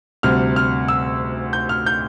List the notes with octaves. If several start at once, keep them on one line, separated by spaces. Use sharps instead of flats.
D2 C3 G3 F6
F6
E6
G6
F6
G6